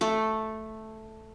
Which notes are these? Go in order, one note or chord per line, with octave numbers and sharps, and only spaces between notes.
A3 A4